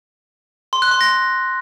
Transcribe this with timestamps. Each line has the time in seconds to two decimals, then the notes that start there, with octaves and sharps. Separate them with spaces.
0.73 C6
0.82 F#6
0.91 C6
1.01 A#6